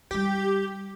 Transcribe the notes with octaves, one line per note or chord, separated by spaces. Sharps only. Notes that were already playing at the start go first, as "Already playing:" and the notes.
G3 E4 G4